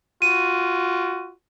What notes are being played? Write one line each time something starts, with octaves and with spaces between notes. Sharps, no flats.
F4 F#4 D#7